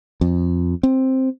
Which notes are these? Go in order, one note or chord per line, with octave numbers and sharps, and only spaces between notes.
F2
C4